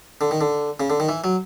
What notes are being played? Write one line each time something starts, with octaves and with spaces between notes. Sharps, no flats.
D3
D#3
D3
C#3
D3
D#3
E3
F#3